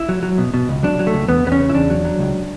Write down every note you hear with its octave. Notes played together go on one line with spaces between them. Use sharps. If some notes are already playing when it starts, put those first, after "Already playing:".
Already playing: E4
F#3
F#3
B2
B2
C#2
F#3 D4
F#3
A3
C#2
E2 B3
E2 B3
C#4
C#3
E4
E2 D4
F#3
F#3
C#2